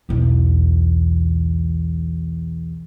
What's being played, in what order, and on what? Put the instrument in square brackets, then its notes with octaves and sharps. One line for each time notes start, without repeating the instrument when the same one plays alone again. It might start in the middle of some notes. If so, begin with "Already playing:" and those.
[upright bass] B1 E2